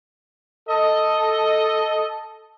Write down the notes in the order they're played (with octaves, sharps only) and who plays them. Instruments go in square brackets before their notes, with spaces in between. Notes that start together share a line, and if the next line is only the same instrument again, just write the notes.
[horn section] A4 D#5